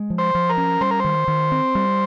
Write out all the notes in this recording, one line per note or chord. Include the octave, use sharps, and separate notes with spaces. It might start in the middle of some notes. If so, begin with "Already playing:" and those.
Already playing: G#3
F3
C5
F3
A#4
C#4
G3 C5
A#4
D#3 C5
D#3
C4
G3